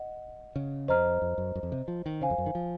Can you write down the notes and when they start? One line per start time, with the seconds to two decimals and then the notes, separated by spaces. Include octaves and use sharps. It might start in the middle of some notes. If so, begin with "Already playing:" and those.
Already playing: D#5 F#5
0.56 C#3
0.88 F2 C5 D#5 A#5 F6
1.22 F2
1.38 F#2
1.55 F#2
1.63 F2
1.72 C3
1.88 F3
2.06 D#3
2.21 C#3 C5 F5 G#5
2.30 F2
2.38 F#2
2.46 D#3
2.55 F3